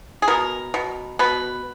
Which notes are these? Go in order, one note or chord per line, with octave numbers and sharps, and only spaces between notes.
G#4
B2 A#4
B2
B2 B4